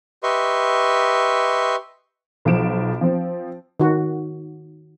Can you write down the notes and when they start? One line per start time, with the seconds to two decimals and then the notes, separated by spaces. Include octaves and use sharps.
0.23 G4 B4 D#5 E5 C6 C#6
2.45 B1 F3 D7 E7
3.01 F3 C4
3.80 D#3 F#4